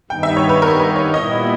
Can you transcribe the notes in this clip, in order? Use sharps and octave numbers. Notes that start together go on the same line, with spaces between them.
G2 D#3 G3 B3 D#4 G5
E5
C#5
B4
A#4
B4
C#5
A#2 G3 B3 E4 D#5